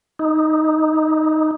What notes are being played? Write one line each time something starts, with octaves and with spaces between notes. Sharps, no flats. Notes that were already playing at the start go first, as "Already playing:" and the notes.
D#4